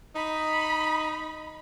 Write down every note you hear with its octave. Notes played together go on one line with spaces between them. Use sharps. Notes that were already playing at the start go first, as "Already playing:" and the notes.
D#4 B5